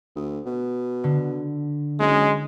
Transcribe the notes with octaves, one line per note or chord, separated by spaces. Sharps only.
D2
B2
D3
F#1 G#3